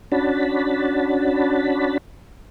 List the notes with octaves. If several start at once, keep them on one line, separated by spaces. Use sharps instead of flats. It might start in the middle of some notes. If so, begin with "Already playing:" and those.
C#4 D4 F#4 A5 B5